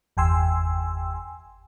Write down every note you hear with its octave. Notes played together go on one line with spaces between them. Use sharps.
G1 E2 G5 G#5 C6 E6